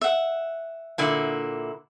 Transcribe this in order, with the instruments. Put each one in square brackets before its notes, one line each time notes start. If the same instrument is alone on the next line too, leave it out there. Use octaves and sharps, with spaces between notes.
[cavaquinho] E5 F#5
[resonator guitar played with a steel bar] A#2 D3 E4